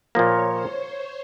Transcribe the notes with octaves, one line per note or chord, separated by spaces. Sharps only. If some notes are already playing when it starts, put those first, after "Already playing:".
A#2 F3 A#3 C#5
C5
C#5